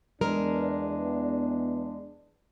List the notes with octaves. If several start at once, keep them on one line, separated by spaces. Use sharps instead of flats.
E2 G#3 D4 A#4